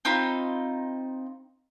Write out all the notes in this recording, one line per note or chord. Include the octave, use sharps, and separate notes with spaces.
C4 D#4 F4 B5